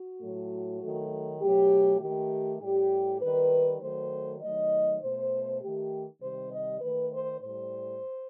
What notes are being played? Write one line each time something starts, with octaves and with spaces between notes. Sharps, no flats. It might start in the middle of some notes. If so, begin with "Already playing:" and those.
Already playing: F#4
A2 F#3 A3
D#3 F#3 A3
B2 F#3 A3 G4
D#3 A3 G4
A2 G3 G4
D#3 G3 B4
D#3 F#3 A3 C5
D#3 F#3 A3 D#5
B2 A3 C5
D#3 A3 G4
C3 D#3 G3 C5
D#5
D#3 A3 B4
C5
A2 G3 C5